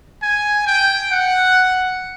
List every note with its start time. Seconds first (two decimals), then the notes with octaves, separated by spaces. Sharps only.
0.22 G#5
0.67 G5
1.12 F#5